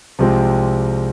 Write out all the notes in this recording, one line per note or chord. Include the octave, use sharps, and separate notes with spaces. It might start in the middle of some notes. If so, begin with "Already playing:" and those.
C2 C3 F3 G#3 C4